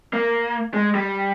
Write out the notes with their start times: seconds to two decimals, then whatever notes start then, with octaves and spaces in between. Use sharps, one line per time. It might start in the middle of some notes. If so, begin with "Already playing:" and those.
0.13 A#3
0.74 G#3
0.95 G3